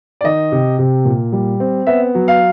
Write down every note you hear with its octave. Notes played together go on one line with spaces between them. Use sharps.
D5
D#3 D#5
C3
C3
A#2
G3
C4
B3 E5
F#3
F5